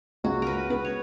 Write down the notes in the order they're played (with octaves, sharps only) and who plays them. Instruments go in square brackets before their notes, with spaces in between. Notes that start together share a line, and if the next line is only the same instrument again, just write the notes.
[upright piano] C#2 [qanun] F#4
[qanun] A#4 B4
[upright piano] B3 [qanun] B4
[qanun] C#5